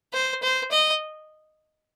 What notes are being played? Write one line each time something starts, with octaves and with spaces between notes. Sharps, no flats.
C5
C5
D#5